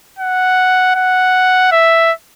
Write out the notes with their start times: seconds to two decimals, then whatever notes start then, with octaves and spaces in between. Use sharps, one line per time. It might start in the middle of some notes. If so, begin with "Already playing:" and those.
0.19 F#5
0.95 F#5
1.72 E5